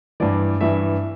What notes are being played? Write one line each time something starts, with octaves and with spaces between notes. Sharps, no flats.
G2 E3 D5
G2 E3 E5